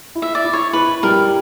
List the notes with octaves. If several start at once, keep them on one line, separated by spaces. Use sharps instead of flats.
E4
E5
D5
E4
C#5
E4 B4
G3 A#4